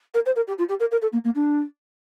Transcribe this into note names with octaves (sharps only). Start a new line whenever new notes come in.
A#4
C5
A#4
G4
F4
G4
A#4
A#4
A4
A#3
A#3
D4